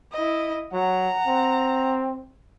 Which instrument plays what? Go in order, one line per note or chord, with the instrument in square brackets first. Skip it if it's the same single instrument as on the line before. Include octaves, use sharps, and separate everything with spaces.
[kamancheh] E4 D#5
[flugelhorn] F#3 [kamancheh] F#5 A#5
[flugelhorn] C4